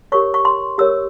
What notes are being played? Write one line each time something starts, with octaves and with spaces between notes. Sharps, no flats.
G4 A#4 C#5 C#6
C#6
C6
G4 A#4 C#5 E6